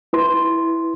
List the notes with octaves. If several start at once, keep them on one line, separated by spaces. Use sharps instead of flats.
E4 B4 C6